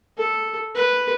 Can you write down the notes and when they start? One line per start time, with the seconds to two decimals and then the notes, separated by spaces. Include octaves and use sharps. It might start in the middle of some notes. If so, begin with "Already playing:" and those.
0.17 A4
0.75 B4